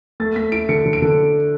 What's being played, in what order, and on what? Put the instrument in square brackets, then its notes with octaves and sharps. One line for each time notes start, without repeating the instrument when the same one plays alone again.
[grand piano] A3 A6
A3 B6
E4 D7
D3 C#7
D3
D7
D3